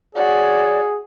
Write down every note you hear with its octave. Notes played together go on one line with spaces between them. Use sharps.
F#4 G#4 C#5 D5